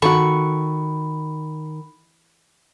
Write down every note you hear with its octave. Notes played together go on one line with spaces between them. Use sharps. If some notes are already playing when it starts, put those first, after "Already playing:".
D#3 F#4 A4 B5 C#6